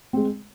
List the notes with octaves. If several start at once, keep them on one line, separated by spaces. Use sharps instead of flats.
G#3 C4